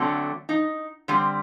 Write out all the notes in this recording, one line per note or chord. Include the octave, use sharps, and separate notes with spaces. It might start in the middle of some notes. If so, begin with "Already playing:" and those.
Already playing: D3 F#3 A3 C4
D#4
D3 G3 C4